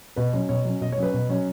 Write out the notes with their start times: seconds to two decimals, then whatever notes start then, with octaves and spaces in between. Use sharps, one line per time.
0.16 B2 B4
0.33 F#3 C#4
0.49 B2 C#5
0.65 F#3 C#4
0.81 B2 D#5
0.92 C#5
0.98 F#3 C#4 B4
1.14 B2
1.29 F#3 C#4